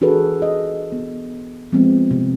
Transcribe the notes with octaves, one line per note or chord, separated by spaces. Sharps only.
E3 D4 F#4 G#4 A4 B4
G#4 D#5
B3
F3 G#3 B3 C4
C3